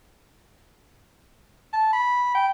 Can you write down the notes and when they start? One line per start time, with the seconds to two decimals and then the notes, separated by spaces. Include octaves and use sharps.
1.73 A5
1.93 B5
2.35 G5